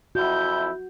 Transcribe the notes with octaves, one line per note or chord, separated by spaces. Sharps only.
F2 E4 F#4 G6